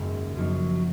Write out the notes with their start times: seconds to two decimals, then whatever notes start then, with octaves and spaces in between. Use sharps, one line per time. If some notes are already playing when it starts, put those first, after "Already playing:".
Already playing: G#1 F#2 C#3 G#3 A#3 A#4
0.35 F#2 F3 F#3 A#3 D#4